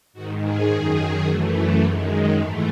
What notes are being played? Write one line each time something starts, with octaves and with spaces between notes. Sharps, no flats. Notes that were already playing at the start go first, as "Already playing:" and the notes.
G#2 D#3 F#4
G#4
F#2 D#3 G#4
F#2 E3 A3
F#2 D#3 G#3
G#2 E3 A3